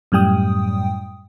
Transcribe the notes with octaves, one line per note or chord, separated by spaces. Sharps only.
F#2 A2 G3 G5 D#6